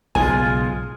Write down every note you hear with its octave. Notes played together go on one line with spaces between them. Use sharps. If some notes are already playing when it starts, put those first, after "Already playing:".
B1 G#2 C#3 G#3 F4 G#4 G#5